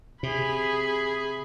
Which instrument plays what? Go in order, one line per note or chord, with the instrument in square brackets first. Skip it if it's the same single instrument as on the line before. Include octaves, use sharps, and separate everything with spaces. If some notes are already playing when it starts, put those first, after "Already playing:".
[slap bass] C3 [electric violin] G#4 B5